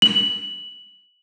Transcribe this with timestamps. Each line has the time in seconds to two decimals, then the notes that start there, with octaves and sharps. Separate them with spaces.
0.02 F#7